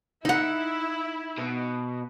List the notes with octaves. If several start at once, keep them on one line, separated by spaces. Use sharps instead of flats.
D#4 E4 F#5
B2